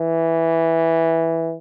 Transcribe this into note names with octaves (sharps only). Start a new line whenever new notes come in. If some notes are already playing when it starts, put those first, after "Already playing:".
Already playing: E3